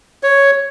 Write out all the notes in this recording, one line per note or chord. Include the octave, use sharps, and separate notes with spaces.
C#5